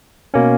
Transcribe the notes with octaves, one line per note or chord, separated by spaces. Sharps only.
B2 A#3 C#4